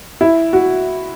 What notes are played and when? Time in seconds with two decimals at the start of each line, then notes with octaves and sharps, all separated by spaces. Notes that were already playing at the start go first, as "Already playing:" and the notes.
0.21 E4
0.53 F#4